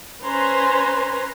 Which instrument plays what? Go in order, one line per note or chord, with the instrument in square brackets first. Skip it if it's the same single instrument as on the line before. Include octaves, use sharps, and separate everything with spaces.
[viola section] C#4 B4 C5 G#5 A#5 C6